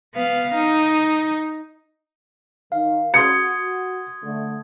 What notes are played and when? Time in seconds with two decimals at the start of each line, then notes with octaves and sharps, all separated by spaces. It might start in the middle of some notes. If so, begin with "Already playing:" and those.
0.15 B3 F5
0.54 D#4
2.72 D#3 F5
3.14 F#4 C6 D#6 G#6 C#7
4.24 D3 A3